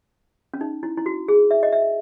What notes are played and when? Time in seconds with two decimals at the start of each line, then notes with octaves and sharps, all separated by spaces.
0.54 C#4
0.61 D#4
0.83 E4
0.97 E4
1.06 F#4
1.28 G#4
1.51 E5
1.63 D#5
1.72 E5